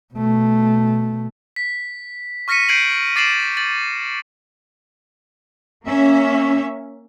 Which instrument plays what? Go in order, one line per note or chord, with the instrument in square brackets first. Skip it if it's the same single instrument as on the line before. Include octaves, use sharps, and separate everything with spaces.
[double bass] B2 A3
[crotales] B6
C#6 F6 A#6 B6 C#7 D#7
G6 G#6 C7 D7 D#7 F#7
D6 A6 C7 D7 E7 F#7
A6 F#7
[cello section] A#3 C#4 E5